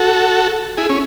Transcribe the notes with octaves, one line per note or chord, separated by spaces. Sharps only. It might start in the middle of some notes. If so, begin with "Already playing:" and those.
Already playing: F#4 A4
E4 G#4
C#4